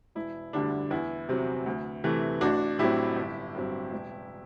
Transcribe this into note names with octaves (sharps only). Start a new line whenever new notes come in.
E1 E4
D2 D3 G3 D4
E2 E4
C3 F#3 C4
D2
C3 E3 A3
A1 D4 F#4
A2 F#3 C4 E4 G4
G1
G2 F#3 C4
E1